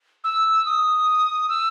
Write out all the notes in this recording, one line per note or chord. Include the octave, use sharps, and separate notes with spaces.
E6
D#6
E6